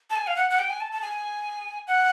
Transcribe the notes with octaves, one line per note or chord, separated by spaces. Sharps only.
A5
G#5
F5
F#5
F#5
G5
G#5
A5
A5
G#5
F#5